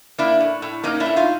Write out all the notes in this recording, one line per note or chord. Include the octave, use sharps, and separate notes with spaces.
A#3 D4 E4
A2
A2
A#3 C#4 D#4
D4 E4
A2
D#4 F4